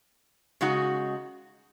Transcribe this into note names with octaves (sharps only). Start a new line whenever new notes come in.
C#3 G#3 D#4 F#4